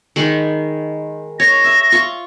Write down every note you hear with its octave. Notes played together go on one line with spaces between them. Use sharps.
D#3 G#3 B5
C#5 A#6
E5
F4 C#6